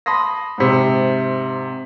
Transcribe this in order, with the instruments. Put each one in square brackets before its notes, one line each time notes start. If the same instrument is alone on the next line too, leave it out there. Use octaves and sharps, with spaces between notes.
[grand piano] A5 B5 C6 D#6 A#6
G#2 C3